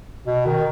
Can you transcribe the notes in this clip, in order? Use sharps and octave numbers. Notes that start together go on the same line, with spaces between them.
B2
D#3